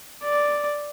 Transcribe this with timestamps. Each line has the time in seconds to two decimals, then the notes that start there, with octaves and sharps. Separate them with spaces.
0.23 D5